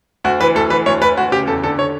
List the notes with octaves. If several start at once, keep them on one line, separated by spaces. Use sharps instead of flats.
D2 F#4
E3 B4
D2 A4
E3 B4
D2 C#5
D2 B4
D2 F#4
C#3 G4
E2 A4
D3 A4
D3 C#5